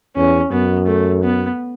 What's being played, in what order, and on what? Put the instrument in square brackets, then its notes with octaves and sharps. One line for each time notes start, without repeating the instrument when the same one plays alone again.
[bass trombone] E2 [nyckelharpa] C#4
[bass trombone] F#2 [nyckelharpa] B3
[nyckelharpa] A3
B3